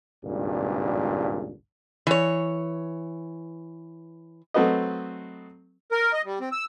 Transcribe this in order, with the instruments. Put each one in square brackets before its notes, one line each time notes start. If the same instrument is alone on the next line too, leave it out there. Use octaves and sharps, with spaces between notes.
[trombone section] G#1 C#2 G2 A#2
[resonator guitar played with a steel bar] E3 C#5
[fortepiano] F#3 A3 C4 F#4 B4 D#5
[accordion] A#4
D#5
G3
C4
E6